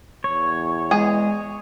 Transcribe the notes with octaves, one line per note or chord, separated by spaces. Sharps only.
E2 C#5
G#3 G#4